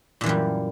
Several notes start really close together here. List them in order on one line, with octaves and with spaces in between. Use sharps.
A#2 E3 F#2 G3